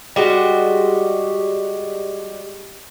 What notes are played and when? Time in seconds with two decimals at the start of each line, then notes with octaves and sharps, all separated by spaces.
0.16 G3 G#3 F#4